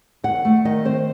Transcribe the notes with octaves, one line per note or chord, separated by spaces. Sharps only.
D#2 F#5
A3
D#3 D#5
C4 C5